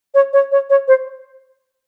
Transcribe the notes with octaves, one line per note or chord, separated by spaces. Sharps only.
C#5
C#5
C#5
C#5
C5